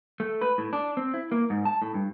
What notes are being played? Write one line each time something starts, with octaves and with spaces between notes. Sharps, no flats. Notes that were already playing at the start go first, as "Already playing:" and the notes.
A3
B4
A2
D4
C4
E4
A#3
G#2
A5
A2
G2